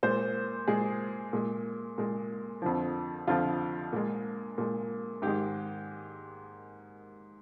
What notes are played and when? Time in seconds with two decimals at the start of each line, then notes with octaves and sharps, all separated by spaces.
0.03 A#2 G#3 C5
0.68 A#2 G#3 G#4
1.33 A#2 G#3
1.98 A#2 G#3
2.62 F2 D3 F3
3.27 F2 D3 F3 F4
3.93 A#2 G#3
4.58 A#2 G#3
5.22 G#2 D#3 G#3 G4